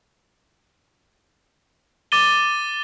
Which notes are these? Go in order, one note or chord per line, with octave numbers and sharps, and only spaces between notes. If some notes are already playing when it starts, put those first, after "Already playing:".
D6 A6 D#7 G7